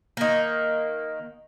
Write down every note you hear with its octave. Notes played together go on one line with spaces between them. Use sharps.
D#3 A#3